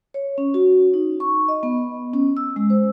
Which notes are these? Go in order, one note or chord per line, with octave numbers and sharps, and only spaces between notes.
C#5
C#4
F#4
D#4
C#6
D#5
B3
C#4
E6
G#3
C5